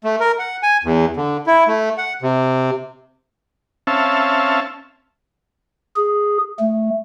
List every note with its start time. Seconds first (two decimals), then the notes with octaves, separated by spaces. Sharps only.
0.04 A3
0.20 A#4
0.39 F#5
0.63 G#5
0.84 E2
1.17 D3
1.47 E4
1.68 A3
1.98 F#5
2.22 C3
3.87 C4 C#4 E5 F5 A5
5.96 G#4
6.59 A3